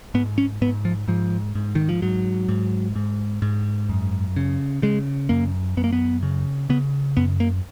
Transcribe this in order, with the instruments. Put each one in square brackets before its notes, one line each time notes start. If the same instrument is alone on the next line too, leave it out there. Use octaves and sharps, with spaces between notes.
[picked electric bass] G#2 B3
C#4
G#2 B3
F3
G#2 F3
G#2
D#3
F3
G#2 F#3
G#2
G#2
G#2
F#2
C#3
C#3 G#3
F#2 A#3
F#2 B3
A#3
B3
C#3
C#3 B3
F#2 B3
A#3